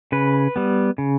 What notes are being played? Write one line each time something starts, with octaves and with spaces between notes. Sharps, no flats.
C#3 B4
G3 B3
C#3